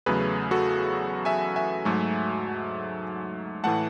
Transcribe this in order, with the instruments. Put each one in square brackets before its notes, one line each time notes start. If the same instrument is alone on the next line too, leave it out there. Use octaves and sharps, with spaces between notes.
[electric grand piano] E2 C#3 F#3 A3 G#4 B4
F#4 A4
E5 G#5
E5 G#5
G#2 F#3 A3
A2 E3 A3 F#5 A5